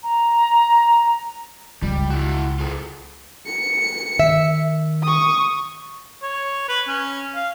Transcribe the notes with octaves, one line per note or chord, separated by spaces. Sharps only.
A#5
C#2 G3
E4 F#4
F4 G#4 A4
C#7
D#3 E5
C#6 D#6
C#5
B4
C#4
F5